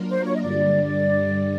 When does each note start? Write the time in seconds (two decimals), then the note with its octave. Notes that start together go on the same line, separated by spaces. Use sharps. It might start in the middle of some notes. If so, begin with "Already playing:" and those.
Already playing: F#3 A#3 D4 F4 A#4
0.10 C5
0.26 C#5
0.35 D#5
0.41 G2 D3 G3 D5